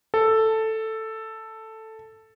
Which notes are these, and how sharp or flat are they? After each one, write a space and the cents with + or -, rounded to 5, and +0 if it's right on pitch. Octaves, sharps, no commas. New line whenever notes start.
A4 +5